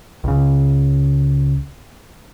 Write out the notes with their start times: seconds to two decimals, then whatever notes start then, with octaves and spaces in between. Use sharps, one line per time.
0.24 C#2 C#3